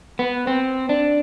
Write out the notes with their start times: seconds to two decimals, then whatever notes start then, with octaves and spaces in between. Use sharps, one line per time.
0.19 B3
0.47 C4
0.89 D4